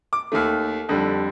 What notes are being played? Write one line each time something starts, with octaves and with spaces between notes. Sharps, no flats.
D6
D#2 D#3 A3
F2 D3 G3